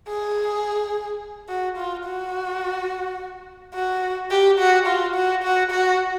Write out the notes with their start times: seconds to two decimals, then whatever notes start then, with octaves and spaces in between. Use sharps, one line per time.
0.08 G#4
1.49 F#4
1.77 F4
2.05 F#4
3.74 F#4
4.31 G4
4.59 F#4
4.87 F4
5.15 F#4
5.43 F#4
5.71 F#4